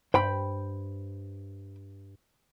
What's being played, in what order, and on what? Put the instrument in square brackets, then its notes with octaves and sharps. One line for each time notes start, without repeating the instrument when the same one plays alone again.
[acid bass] G2 [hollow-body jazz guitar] C5 G5 B5